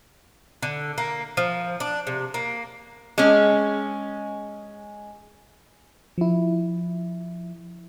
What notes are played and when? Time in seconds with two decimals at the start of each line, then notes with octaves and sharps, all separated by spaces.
0.62 D3
0.98 A#3
1.37 F3
1.80 D4
2.07 C3
2.34 A#3
3.18 G#3 C#4
6.18 F3 E4